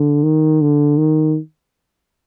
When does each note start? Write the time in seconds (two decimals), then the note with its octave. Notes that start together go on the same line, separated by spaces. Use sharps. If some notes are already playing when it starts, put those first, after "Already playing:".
Already playing: D3
0.24 D#3
0.62 D3
0.98 D#3